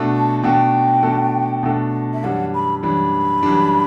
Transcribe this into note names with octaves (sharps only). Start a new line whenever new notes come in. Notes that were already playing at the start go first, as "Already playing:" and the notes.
Already playing: B2 A3 D4 F#4 A4
A5
B2 A3 D4 F#4 A4 G5
B2 A3 D4 F#4 A4
B2 A3 D4 F#4 A4
E5
F#2 E3 G3 D4 F#5
B5
F#2 E3 G3 D4 B5
F#2 E3 G3 D4